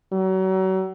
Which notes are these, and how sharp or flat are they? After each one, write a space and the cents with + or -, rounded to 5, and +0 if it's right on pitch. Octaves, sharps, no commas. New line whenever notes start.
F#3 +35